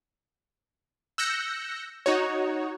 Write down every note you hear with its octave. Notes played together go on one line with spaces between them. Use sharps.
E6 F#6 G6 A#6 C#7
D#4 F#4 C#5